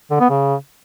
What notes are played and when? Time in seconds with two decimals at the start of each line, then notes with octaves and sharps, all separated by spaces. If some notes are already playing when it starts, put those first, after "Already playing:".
0.11 D3
0.20 B3
0.30 C#3